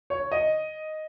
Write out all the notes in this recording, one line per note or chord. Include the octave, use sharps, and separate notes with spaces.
C#5
D#5